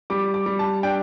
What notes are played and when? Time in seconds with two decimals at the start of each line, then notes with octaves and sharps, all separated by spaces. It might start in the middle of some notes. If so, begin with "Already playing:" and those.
0.10 G3 D6
0.34 D6
0.46 G3
0.59 A5
0.83 D4 G5